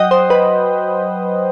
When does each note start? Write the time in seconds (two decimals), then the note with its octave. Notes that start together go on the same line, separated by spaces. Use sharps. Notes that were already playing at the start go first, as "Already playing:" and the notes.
Already playing: F#3 D#5 F#5 G5
0.11 C5
0.30 B4